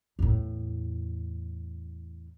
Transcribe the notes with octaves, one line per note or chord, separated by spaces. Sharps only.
E2 A2